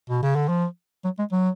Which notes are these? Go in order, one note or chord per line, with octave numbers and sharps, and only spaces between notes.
B2
C#3
D3
F3
F#3
G#3
F#3